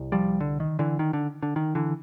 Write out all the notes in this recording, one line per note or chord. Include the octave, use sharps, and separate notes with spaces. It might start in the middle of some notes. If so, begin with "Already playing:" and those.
Already playing: C2
F3 G3
D3
D#3
D3 E3
D#3
D3
D3
D#3
D3 E3